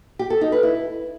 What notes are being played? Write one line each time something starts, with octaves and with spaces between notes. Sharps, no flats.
G4
A4
D#4
B4
E4